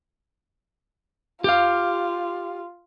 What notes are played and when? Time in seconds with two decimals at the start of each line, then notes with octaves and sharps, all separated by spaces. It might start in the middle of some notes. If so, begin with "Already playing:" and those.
1.44 F4 G4 F5